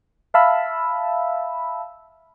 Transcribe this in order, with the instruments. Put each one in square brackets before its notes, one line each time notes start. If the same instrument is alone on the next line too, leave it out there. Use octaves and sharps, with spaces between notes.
[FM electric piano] E5 F5 A5 B5 E6